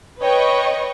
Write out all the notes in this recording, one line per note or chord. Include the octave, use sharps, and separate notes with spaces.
B4 C#5 D#5 G5 C#6